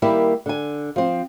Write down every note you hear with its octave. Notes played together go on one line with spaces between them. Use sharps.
D#3 G3 A#3 E4 G4
D3 G#5
F3 C4